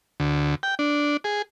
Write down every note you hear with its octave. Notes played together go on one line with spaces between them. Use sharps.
D2
G5
D4
G#4